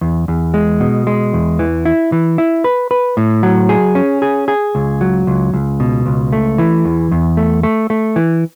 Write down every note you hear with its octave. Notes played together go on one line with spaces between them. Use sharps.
E2
E2
G#3
B2
G#3
E2
E3
E4
E3
E4
B4
B4
A2
F#3
G#4
C#4
G#4
G#4
C#2
F#3
C#2
C#2
B2
C#2
A3
E3
E2
E2
A3
A3
A3
E3